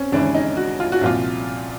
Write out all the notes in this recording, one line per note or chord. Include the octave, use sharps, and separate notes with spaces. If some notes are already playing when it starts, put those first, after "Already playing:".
Already playing: C4 C#4
D#2 C#3 E3 G#3 D4
D#4
F#4
F4
F#4
C2 A#2 F3 F4